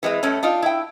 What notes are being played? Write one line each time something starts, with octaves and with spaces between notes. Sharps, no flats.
E3 G#3 B3 C4
G2 A3 C#4
D4 D#4 F4
E4 G5